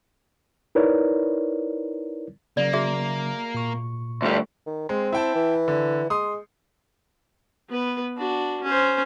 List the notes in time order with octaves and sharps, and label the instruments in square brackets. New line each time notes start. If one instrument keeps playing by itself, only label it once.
[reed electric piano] D#4 E4 A#4 B4 C#5 D5
[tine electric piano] C#3 F#3 [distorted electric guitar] A#3 [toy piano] D5
[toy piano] F#4 G#4 E5
[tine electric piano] A#2 C#6
[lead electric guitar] D2 G3
[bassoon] D#3
[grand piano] G#3 [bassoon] C4
[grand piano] E4 G5 A5
[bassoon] E3
[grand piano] D3
[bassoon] G#3 [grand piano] C6 D#6
[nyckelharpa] B3 B4
D4 F#4
C#4 C5